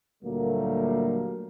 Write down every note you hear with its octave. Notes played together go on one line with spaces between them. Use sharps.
D2 A#2 F#3 G3 A3 A#3